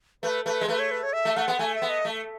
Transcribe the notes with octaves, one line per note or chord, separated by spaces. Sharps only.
A3 B4
A3 B4
G#3
A3 B4
C#5
B4
C#5
E5
A3
A3 F#5
B3
A3 G#5
E5
B3
D#5
A3